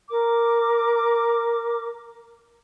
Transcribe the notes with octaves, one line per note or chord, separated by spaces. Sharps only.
A#4 D6